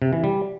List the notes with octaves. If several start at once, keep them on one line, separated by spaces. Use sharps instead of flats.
C3
E3
G3